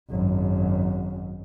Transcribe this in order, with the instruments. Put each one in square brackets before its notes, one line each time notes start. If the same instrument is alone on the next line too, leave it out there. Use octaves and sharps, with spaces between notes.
[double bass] G#1 F#2